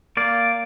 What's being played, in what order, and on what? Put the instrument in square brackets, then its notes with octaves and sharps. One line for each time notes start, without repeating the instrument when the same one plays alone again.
[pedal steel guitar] A#3 D5 F5